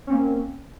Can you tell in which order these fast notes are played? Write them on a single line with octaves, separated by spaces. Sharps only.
C#4 C4 A#3